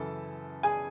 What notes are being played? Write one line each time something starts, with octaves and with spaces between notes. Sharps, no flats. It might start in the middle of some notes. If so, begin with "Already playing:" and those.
Already playing: F#2 C#3 E3 A4 A5
G#4 G#5